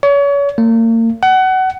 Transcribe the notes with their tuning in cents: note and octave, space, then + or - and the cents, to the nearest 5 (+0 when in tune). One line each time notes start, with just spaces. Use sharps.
C#5 +35
A#3 -40
F#5 +25